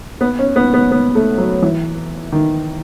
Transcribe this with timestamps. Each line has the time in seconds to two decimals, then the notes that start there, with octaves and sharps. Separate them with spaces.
0.21 B3
0.39 C#4
0.56 B3
0.74 B3
0.92 B3
1.15 A3
1.38 F#3
1.63 E3
2.32 D#3